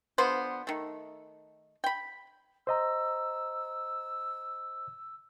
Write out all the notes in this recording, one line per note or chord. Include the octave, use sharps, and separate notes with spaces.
D3 F3 B3 C5
D#3 A3
G5 B5
C5 D#5 A#5 E6